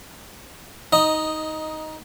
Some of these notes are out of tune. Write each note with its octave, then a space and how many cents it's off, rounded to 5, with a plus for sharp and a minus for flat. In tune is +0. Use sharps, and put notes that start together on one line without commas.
D#4 +15 D#5 +0